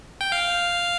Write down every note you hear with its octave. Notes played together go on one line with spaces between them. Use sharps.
G5
F5